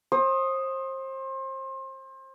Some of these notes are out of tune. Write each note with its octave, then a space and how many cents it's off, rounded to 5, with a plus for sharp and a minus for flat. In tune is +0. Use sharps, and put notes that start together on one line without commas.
C5 +30 D#6 +0